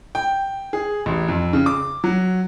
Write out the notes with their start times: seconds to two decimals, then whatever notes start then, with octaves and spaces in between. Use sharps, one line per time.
0.15 G5
0.73 G#4
1.06 A1
1.28 F2
1.53 C#3
1.66 D6
2.04 F#3